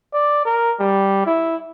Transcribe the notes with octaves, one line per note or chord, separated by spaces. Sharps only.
D5
A#4
G3
E4